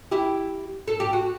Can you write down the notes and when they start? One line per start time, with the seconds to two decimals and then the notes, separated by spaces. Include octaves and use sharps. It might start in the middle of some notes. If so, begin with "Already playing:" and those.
0.11 E4 G4
0.88 A4
1.00 G4
1.13 F#4